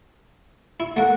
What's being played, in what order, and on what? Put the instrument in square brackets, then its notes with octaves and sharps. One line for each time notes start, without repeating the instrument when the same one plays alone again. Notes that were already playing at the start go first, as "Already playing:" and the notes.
[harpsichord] E4
[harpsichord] A3 A#3 [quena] F#5